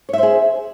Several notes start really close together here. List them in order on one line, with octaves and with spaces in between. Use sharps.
C#5 E5 C5 G#4